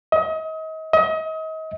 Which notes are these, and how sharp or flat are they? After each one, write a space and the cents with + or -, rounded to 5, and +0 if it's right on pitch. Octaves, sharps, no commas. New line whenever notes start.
D#5 +35
D#5 +35